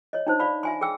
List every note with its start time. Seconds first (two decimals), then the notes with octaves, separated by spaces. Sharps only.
0.13 C#5 D#5
0.27 D4 D#4 C5
0.40 D5 F5 B5
0.63 E5 G#5 C6
0.81 G#4 G5 E6